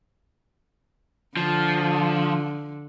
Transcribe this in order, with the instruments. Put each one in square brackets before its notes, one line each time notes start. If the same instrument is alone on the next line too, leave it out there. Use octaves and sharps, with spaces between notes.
[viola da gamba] D3 [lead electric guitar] F3